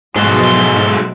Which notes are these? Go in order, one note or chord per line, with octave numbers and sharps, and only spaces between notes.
G#2 B2 F3 F#3 G#3 A3 F#4 C6